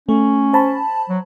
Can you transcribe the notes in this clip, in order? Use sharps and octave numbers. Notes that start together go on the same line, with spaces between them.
A3 C#4
C5 A5 B5
F#3